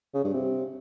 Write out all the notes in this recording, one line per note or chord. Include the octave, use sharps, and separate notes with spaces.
C#3
G2
C3